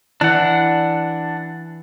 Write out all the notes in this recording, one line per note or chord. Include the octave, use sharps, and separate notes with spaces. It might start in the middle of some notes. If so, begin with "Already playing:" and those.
E3 D4 F#5